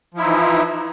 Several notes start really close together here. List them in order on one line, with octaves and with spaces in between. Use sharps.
F3 E4 D#4 E3